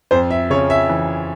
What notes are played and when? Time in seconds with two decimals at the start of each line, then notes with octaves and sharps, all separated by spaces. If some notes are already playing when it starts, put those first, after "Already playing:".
0.11 F2 C5
0.31 E5
0.50 C#3 C#5
0.70 E5
0.89 E3